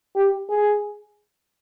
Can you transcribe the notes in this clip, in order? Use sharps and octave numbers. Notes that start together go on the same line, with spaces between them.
G4
G#4